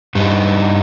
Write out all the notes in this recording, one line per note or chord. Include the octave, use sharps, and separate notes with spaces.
G2 G3 D#4